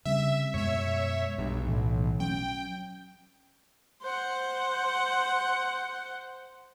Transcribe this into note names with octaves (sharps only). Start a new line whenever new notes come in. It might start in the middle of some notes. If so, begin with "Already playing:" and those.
C#3 G3 C4 E5
F#2 B2 G#3 C#5 E5
B1 G2
A2 E3
F#3 C#4 G5
C5 F#5